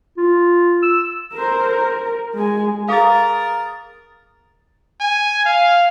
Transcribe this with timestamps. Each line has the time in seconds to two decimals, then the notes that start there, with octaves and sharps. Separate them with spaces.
0.17 F4
0.83 E6
1.33 A#4 C5
1.68 A#4
2.35 G#3 G#5
2.88 G#4 A#4 F5 D#6 A6
5.01 G#5
5.45 F5